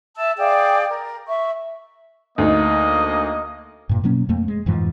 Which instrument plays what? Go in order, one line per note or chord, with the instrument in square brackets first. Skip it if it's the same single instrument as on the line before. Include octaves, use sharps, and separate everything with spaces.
[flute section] E5 A5 E6
G#4 D5 F5 G5
A#4
E5 C#6
[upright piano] D2 D#4 [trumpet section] A#3 D#5
[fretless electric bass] G2 A#2
B2 F#3 A#3 C#4
F2 A3 A#3
G#3
F2 G#2 E3 F3